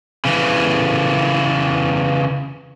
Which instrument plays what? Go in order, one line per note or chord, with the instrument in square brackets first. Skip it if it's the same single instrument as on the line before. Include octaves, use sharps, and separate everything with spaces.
[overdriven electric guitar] C#3 E3